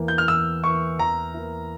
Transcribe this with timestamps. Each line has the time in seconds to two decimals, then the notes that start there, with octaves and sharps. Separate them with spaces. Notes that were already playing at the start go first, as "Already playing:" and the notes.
Already playing: E2 E3 A#3 E4
0.08 G6
0.18 F6
0.28 E2 E6
0.63 E3 A#3 E4 C#6
0.99 E2 A#5
1.34 E3 A#3 E4